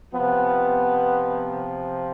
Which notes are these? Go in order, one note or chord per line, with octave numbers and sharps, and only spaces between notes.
C3 F3 B3